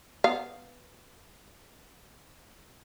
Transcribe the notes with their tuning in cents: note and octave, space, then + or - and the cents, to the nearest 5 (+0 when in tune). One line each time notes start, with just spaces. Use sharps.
B3 +0 F5 +0